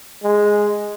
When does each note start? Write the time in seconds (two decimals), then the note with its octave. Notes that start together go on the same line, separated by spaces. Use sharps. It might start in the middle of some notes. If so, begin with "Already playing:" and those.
0.23 G#3